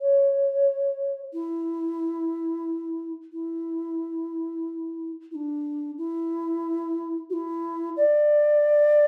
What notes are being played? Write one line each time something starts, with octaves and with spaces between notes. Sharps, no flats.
C#5
E4
E4
E4
D4
E4
F#4
E4
D5